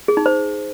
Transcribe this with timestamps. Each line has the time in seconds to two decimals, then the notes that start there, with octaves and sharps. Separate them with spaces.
0.08 G#4
0.17 D#4
0.26 C5